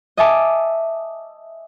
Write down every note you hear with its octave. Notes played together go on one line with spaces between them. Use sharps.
D#5 E5 G#5 A5 D6